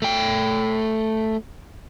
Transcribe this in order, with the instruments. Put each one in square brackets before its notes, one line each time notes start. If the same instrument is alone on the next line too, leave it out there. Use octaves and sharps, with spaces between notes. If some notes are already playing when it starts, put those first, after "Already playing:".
[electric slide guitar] A3 G5